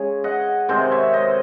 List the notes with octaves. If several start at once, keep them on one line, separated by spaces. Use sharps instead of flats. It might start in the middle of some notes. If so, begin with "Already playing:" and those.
Already playing: C#3 G#3 G#4 C#5
D#5 F#5
C3 D#3 G#3 C4 C5 D#5
C#5 E5
C5 D#5